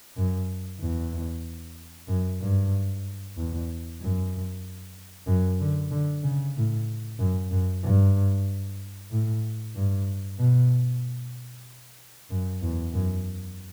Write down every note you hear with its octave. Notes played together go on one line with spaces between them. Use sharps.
F#2
E2
F#2
G2
E2
F#2
F#2
D3
D3
C#3
A2
F#2
F#2
G2
A2
G2
B2
F#2
E2
F#2